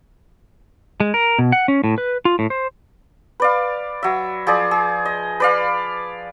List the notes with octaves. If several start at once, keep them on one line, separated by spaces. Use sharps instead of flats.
G#3
A#4
B2
F#5
C#4
A2
B4
F4
A2
C5
B4 D5 F5
F#3 E5
F3 G#4 D5
G#4
D#5
B4 D5 F5